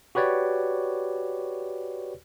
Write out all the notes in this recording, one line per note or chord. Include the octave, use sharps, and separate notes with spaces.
F#4 G4 B4 C#5 D5